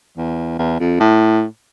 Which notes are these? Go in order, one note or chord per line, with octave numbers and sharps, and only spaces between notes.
E2
E2
F2
A2